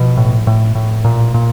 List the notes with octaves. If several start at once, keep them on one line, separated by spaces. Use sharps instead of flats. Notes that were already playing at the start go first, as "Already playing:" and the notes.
Already playing: B2 F3
A2
A2
A2
A#2
A#2